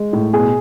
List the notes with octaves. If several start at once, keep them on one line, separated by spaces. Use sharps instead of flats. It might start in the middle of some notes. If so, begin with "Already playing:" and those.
Already playing: G#3
A2
B2 G#4